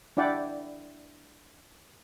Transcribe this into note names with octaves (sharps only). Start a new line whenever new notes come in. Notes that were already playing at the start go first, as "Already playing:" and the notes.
D4 E4 D5 F#5 G5